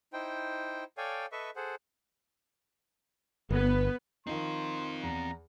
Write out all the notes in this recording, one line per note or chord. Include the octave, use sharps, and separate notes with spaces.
D#4 E4 C5 G5
A4 C#5 D5 F5 G5 G#5
A4 B4 D#5 E5 C#6
G#4 A4 C5 F#5
G1 B3 B4
D#3 F3 C4 D#4 F5 C6
E2 A#5